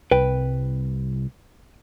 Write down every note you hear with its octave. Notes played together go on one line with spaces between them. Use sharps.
C2 B4 G5